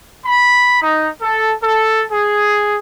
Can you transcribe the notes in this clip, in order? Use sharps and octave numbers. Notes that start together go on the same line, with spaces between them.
B5
D#4
A4
A4
G#4